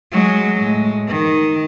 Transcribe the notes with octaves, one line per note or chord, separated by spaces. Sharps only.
F#3 G#3
A2 G#3
D#3